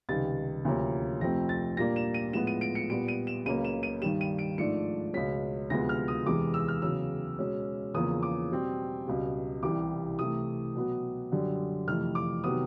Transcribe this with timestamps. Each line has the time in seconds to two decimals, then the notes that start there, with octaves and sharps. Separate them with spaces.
0.09 C#2 C3 D#3 G3 A6
0.65 D2 C3 F3 A#3 C#4
1.21 F2 C3 F3 A3 C4 A#6
1.49 A6
1.77 A#2 G3 A#3 D4 A#6
1.96 E7
2.14 D#7
2.33 A2 F3 G#3 B3 E7
2.47 D#7
2.61 D7
2.75 C#7
2.90 A#2 G3 B3 D7
3.08 D#7
3.27 E7
3.46 C#2 C#3 F#3 A#3 C#4 D#7
3.64 E7
3.83 D#7
4.01 G2 D#3 G3 E7
4.21 D#7
4.39 D7
4.58 G#2 F3 A3 D4 C#7
5.14 C#2 B2 G#3 C#4 B6
5.70 D2 C3 F3 G#3 B3 A#6
5.89 F6
6.08 D#6
6.26 E2 C3 E3 G#3 D6
6.54 E6
6.68 F6
6.82 E2 C#3 F#3 E6
7.39 B2 G#3 C#4
7.94 E2 C#3 F3 A#3 C#4 D#6
8.23 D6
8.50 B2 G3 C4
9.07 C#2 B2 G3
9.63 C2 C3 E3 G3 D6
10.19 C3 E3 A3 D#6
10.75 B2 F#3 B3
11.32 F#2 D3 G3
11.87 F2 C3 E3 A3 F6
12.15 D6
12.44 C3 D#3 F#3 B3 D#6